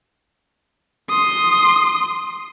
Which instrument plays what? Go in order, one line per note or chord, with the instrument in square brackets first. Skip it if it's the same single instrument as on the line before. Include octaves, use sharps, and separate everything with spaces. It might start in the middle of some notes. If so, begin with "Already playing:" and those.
[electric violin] C6 D#6